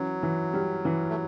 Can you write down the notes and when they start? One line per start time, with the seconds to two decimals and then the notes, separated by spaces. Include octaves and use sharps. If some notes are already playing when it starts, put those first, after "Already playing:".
Already playing: E3 F#3 C#4
0.23 E3
0.53 G3
0.85 E3
1.10 A3